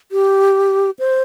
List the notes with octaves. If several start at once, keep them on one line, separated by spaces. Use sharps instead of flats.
G4
C5